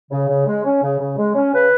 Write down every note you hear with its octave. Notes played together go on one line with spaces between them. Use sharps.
C#3
C#3
G#3
C#4
C#3
C#3
G#3
C#4
C#3 B4